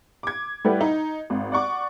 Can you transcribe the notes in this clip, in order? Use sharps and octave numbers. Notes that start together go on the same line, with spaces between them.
D6 G#6
G3 A3 E4 G4 B4 F#5
D#4
G#1
D5 F#5 C#6 D6